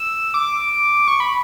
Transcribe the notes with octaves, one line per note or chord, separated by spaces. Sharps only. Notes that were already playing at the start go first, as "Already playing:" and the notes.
Already playing: E6
D6
C#6
B5